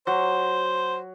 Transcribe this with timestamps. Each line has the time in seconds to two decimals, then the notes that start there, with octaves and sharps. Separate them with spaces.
0.07 F#3 C5